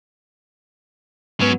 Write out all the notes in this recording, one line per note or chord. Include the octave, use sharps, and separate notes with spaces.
G#2 F#3 B3 C#4